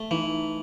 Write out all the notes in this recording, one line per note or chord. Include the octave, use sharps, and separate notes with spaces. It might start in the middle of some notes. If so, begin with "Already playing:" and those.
Already playing: A3
E3 D#4